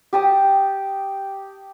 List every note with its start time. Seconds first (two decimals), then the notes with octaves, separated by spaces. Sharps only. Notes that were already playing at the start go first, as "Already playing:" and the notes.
0.13 G4 A5 D#6